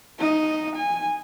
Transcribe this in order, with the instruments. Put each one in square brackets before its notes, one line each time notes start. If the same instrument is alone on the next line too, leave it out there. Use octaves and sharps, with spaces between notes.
[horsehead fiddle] D#4 D#5
G#5